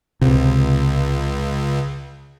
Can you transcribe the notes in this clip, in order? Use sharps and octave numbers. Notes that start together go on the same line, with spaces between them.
C#2 C3